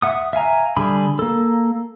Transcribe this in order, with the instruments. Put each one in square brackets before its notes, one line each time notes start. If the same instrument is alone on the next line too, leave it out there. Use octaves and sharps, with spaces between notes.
[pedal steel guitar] E5 F#5 D#6
E5 F5 G#5 A#5
D3 G3 G#4 B5
A#3 A4